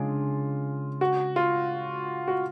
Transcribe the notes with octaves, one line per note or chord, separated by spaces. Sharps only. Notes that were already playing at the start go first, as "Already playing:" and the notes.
Already playing: C#3 G#3 D4 F4
F#4
F4
F#4